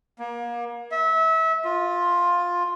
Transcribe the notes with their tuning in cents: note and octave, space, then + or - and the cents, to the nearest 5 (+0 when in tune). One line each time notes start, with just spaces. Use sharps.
A#3 +30
E5 -25
F4 +10